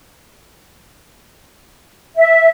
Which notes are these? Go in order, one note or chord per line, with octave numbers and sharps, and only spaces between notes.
E5